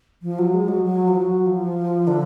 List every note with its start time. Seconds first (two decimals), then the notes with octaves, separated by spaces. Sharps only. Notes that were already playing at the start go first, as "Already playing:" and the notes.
0.22 F3
0.39 F#3
0.54 G#3
0.68 F#3
0.84 F#3
1.08 F3
1.16 F#3
1.46 F3
2.07 D3